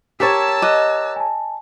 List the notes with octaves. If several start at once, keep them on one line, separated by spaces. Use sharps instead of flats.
G4 A#4 C#5 A5 E6 G#6 A6 B6
D#5 D6 F#6
G#5 A5